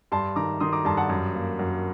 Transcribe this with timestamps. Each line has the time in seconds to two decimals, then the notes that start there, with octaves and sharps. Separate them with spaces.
0.12 G2 A5 C6
0.36 D#3 A#5 D6
0.60 D#3 C6 D#6
0.73 A#5 D6
0.85 G2 A5 C6
0.97 F#5 A5
1.09 F#2
1.35 A#3
1.59 F#2